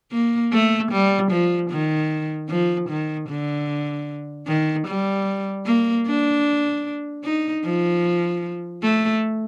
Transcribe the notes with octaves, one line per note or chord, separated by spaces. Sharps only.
A#3
A3
G3
F3
D#3
F3
D#3
D3
D#3
G3
A#3
D4
D#4
F3
A3